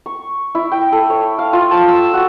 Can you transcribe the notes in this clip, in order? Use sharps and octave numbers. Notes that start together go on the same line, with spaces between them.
C#6
E4
G5
A4
C#5
F5
F4
A5
E6
F#4